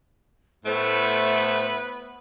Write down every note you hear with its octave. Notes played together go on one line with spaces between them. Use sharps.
A2 A3 B3 B4 C5